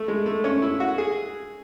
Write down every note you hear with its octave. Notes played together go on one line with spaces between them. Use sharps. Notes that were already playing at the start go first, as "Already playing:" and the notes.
Already playing: A3
G#3
A3
C#4
E4
F#4
G#4